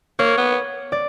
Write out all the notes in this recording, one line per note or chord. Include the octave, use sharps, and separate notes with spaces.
A#3 C#5
B3
D5